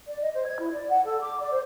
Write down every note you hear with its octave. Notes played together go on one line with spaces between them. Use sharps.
D5
D#5
C5
G#6
E4
D5
F#5
A4
D6
D5
C5